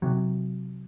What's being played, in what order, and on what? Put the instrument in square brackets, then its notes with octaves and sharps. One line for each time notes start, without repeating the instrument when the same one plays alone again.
[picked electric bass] C3 F#3